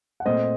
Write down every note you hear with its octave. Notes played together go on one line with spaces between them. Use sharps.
F#5
A#2 A3 C4 C5 D#5